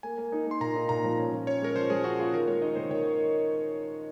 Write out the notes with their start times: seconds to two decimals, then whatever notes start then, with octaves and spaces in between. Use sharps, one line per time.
0.03 A#3 G#5
0.18 A#3
0.32 D#4
0.46 A#3 C6
0.60 A#2 A#5
0.76 D#4
0.89 A#2 A#5
1.04 F3
1.18 C#4
1.33 F3
1.47 C#4 C#5
1.62 G#3 A#4
1.76 F3 C5
1.90 F3 G#4
2.04 C#4 F#4
2.19 F4 G#4
2.33 D#3 A#4
2.48 G#3 C#5
2.62 D#4 D#5
2.76 D#3 C5
2.91 D#3 C#5